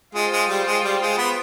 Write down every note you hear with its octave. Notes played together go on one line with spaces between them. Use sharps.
G#3 F4 C5 G5
G#3
G3
G#3
G3
G#3
B3